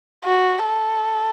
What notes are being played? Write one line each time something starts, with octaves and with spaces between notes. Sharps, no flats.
F#4
A4